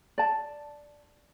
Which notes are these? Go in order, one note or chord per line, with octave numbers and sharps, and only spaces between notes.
D5 A5